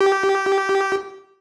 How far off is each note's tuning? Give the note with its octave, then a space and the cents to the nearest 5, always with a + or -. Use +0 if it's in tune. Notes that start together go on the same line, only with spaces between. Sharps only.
G4 -15